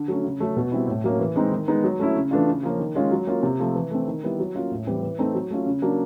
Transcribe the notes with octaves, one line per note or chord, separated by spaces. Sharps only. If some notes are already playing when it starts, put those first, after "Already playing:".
Already playing: D3
F#3 A3 C#4
C#3
F#3 A3 C#4
B2
G3 C4 E4
A2
F#3 A#3 C#4
E3
G#3 C4 D#4
D#3
G#3 B3 D#4
F#3
A3 C#4 E4
C#3
E3 A3 D4 F4
C#3
F3 A#3 C#4
D#3
G#3 C#4 F4
F#3
A#3 C#4 F4
C3
F3 A3
E3
A3 C4
D#3
G3 B3 E4
F#3
A#3 C#4 F4
A2
E3 G3 C4
E3
A3 C4 D#4
F#3
A3 C#4 F4
C#3
F#3 A#3 D4